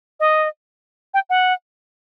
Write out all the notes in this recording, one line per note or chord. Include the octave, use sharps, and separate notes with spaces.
D#5
G5
F#5